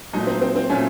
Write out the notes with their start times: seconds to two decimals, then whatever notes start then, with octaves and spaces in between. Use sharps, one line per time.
0.13 A#2 F#3 A3 D#4
0.27 C4
0.41 C4
0.56 C4
0.70 A#2 F#3 A3 C#4